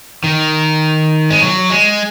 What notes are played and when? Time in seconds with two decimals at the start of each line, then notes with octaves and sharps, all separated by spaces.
0.24 D#3
1.30 G#3
1.41 F#3
1.70 G#3